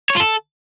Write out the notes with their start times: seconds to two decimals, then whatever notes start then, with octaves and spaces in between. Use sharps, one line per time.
0.10 C#5
0.15 F4
0.20 A4